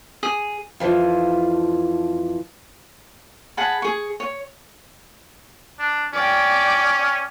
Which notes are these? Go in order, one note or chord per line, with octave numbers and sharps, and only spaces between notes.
G#4
F2 E3 F3
G#4 F#5 A5 B5
G#4 C#6
C#5
D4
C#4 D5 G5